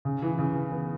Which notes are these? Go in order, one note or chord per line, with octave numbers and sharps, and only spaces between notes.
C#3
E3
C#3
E3
B3